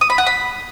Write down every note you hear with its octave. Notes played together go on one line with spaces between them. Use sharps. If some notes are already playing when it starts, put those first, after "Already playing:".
D#6
B5
F#5
B5